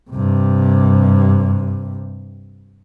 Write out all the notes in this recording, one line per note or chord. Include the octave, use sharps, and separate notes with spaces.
G2 C3